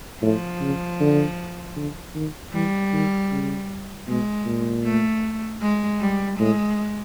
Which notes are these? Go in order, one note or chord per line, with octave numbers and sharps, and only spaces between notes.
A2 F3
C#3
D3
D3
D#3
E3 G3
D#3
C#3
B2 G#3
A#2
A3
G#3
G3
A2 G#3